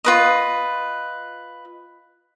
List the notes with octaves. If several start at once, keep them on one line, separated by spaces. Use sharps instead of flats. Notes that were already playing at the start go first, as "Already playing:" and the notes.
F4 B4 D#5